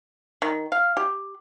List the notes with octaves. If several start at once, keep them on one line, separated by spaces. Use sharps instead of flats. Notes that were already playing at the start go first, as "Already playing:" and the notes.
D#3
F5
G4